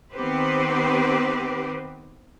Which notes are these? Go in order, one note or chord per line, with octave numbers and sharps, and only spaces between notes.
D#3 B3 C4 G4 B4 C5